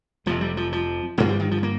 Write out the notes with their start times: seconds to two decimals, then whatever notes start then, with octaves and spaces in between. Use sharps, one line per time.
0.26 F1 F2 C3 F3
0.41 G3
0.57 F3
0.72 F3
1.17 G1 G2 A#3
1.29 G3
1.40 D#3
1.51 F3
1.63 A#3